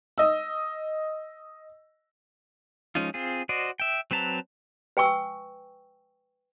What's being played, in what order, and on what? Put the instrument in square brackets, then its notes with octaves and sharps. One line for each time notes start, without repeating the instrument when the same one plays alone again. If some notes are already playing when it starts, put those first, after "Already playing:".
[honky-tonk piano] D#5 E6
[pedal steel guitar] F3 G#3 C#4 D#4 F4
C4 F4 G#4
F#4 C5 D5 D#5
E5 G5
F#3 C4 B4 A5 A#5
[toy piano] B4 G5 G#5 C#6 E6